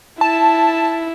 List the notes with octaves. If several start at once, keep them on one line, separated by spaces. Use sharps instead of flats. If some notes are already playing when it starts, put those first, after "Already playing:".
E4 A5